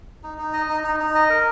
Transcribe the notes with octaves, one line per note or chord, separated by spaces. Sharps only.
D#4
D#4
D#5
D#4
D#4
D#4
D#5
A#4